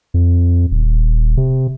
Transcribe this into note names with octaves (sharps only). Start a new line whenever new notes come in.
F2
D#1
C3